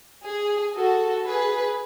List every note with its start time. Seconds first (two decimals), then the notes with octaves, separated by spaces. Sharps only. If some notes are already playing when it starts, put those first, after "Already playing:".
0.24 G#4
0.75 F#4 A4
1.26 G#4 B4